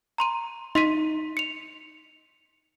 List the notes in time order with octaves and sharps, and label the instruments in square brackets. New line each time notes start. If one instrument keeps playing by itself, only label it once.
[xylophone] A#5 C6 D#7
[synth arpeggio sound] D#4 [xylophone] C6 B6 D#7
[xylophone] C#7 F7